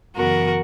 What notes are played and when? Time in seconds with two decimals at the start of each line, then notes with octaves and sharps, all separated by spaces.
0.16 F#2 C#3 E3 B3 F#4 A#4